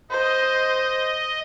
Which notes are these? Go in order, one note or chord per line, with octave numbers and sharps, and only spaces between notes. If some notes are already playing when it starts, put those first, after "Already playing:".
C5 D#5